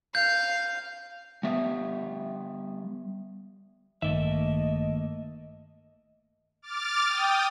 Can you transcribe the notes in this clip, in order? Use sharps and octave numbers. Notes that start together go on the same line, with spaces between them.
F5 G6
G3 B3 E5
A1 G2 D#3 A3 A#3 D#5 E5
D6 F6 A6
G5 D#6